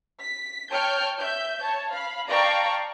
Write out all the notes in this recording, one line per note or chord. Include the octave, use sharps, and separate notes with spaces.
B6
C#5 G5 A5 F6 G6
E5 G6
C#5 A5
F5 B5
D5 F5 G5 A5 A#5 C#6